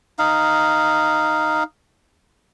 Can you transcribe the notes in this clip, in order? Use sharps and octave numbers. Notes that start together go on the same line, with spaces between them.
D#4 F5